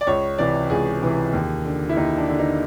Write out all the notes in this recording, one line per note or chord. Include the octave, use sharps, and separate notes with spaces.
D5
C#2 C#5
C3 E3 D5
C#2 G#4
C3 E3
D#2
D3
E4
D#2 D#4
D4
D3
D#4